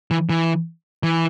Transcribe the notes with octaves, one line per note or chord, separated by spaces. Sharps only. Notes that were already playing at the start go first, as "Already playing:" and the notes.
E3
E3
E3